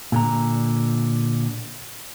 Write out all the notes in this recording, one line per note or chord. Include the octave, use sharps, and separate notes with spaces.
A#2 D3 A#5